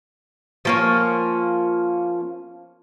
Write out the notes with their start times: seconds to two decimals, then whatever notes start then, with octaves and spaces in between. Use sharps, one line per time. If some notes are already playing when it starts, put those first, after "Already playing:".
0.65 F3 A#3 C#4